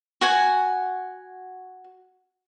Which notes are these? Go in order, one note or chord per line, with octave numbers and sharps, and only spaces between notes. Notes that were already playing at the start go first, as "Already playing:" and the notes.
F#4 F#5 G#5